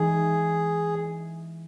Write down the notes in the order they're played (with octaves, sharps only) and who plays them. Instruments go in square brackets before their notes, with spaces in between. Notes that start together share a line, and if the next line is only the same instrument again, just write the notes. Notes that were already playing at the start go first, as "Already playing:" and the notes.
Already playing: [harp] E3 G#3 D#4 [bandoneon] G#4